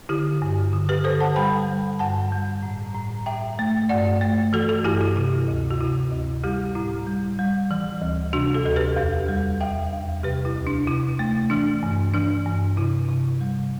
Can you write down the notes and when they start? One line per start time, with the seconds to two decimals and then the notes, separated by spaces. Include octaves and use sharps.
0.09 D3 E4 G4
0.42 G2
0.73 D3
0.89 G4 B4
1.04 D3 A4 C5
1.20 F#5 A5
1.36 G3 G5 B5
1.68 G3
1.99 G2 F#5 A5
2.32 G3
2.63 A2
2.95 A2
3.26 A2 E5 G5
3.59 A3
3.89 G2 D5 F#5
4.21 A3
4.53 E3 F#4 A4
4.69 F#4 A4
4.84 G2 E4 G4
5.01 E4
5.16 C3 E4
5.48 D2
5.71 F#4
5.81 C3 E4
6.12 D2
6.44 G3 E4 G4
6.75 A2 E4
7.07 G3
7.39 G3
7.71 E3
8.02 D2
8.33 C3 D4 F#4
8.54 F#4 A4
8.65 D2 A4
8.76 G4 B4
8.96 E2
9.28 G3
9.61 E2 E5 G5
9.93 E2
10.23 C3 G4 B4
10.45 E4
10.56 D2
10.67 D4
10.87 C3 E4
11.19 A3
11.50 E3 D4
11.83 G2
12.14 E3 D4
12.46 G2
12.77 C3 E4
13.08 C3
13.41 G3